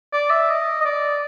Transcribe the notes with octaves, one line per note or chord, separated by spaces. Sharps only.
D5
E5
D#5
D#5
D5